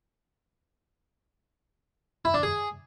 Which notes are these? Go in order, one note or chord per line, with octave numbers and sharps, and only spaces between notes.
E4
D4
G#4